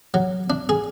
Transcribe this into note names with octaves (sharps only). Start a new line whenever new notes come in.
F#3
D4
G#4